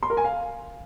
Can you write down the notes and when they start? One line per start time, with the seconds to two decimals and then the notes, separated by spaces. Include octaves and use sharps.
0.03 C6
0.10 A#4
0.17 G#5
0.24 F5